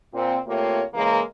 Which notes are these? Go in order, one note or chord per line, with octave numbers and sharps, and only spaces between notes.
A#2 C4
C3 A3 A#3 F4 C#5
C#3 E3 G#3 A#3